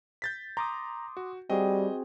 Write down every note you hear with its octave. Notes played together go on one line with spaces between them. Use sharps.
G6 A6 B6
A#5 C6 D6 D#6
F#4
G3 C4 F#4 G#4 D#5